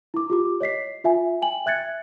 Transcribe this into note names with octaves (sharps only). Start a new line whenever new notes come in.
E4 D6
F4 G4 D6
C#5 D#5 B6 C7
F4 E5 G#5
G5 G#5 F#7
E5 F#6 G#6 A6 C#7